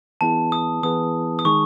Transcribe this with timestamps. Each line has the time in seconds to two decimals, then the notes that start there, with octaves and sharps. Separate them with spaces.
0.21 E3 B3 E4 G#4 B4 A5
0.52 D#6
0.83 E3 B3 E4 G#4 B4 D#6
1.39 D#6
1.45 D#3 G#3 D#4 G#4 C#6